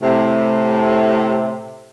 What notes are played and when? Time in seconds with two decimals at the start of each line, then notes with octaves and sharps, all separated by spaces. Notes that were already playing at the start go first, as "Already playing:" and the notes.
0.01 A2 C3